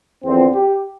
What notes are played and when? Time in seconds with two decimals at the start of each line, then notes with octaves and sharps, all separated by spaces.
0.25 E2 D3 F3 C4
0.54 G4